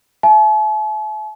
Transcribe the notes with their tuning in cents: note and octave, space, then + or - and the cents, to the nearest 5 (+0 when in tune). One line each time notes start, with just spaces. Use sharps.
E5 +45 A5 -45